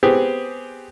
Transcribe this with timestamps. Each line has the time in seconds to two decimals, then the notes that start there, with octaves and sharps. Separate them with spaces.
0.03 B3 C4 G4 G#4